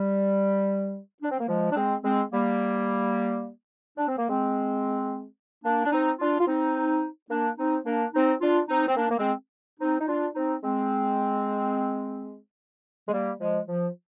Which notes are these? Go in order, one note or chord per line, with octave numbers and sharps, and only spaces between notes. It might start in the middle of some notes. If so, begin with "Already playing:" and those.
Already playing: G3
D4
C4
A#3
F3 G#3
D4
G#3 C4
G#3 C4
G3 A#3
D4
C4
A#3
G#3 C4
A#3 D4
D4
C4 D#4
D4 F4
F4
C4 D#4
A#3 D4
C4 D#4
A#3 D4
C4 D#4
D4 F4
C4 D#4
C4
A#3 D4
A#3
G#3 C4
C4 D#4
D#4
D4 F4
C4 D#4
G#3 C4
G#3
G3 A#3
F3 G#3
F3